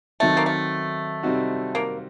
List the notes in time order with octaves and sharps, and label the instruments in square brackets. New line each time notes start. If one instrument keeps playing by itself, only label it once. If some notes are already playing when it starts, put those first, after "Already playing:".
[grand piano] D#3 F#3 C4 D#4 [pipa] A3
[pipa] A#3
A3
[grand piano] C3 G3 C4 D#4 F#4
[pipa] A#3